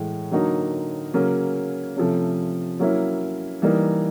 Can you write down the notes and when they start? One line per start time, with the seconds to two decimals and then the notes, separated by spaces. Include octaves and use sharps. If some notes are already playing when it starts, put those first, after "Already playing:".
Already playing: A2 E3 G#3
0.31 D3 F#3 A#3 D#4 F#4
1.14 C#3 F#3 A#3 C#4
1.96 C3 F3 A3 C#4
2.79 F#3 A#3 C#4 E4
3.62 E3 G3 A#3 D#4